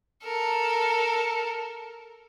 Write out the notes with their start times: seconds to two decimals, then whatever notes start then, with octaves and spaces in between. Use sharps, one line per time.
0.23 A4 A#4